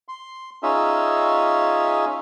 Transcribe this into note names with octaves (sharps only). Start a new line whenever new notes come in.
C6
C#4 D#4 F4 G#4 E5